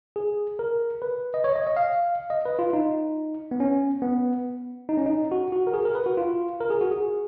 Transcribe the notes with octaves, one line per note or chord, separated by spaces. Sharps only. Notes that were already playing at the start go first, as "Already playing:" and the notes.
G#4
A#4
B4
D#5
C#5
D#5
D#5
F5
D#5
B4
F4
D#4
B3
C#4
B3
D#4
C#4
D#4
F#4
F#4
A#4
G#4
A#4
B4
F#4
F4
A#4
G#4
F#4
G#4